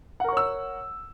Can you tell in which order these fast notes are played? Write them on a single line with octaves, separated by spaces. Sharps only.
F#5 A#4 C#6 C#5 E6